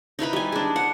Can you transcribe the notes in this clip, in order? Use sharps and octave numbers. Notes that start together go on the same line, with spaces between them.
D#4 E4 B4 B5
G3 G#5
G#3 D4
F#5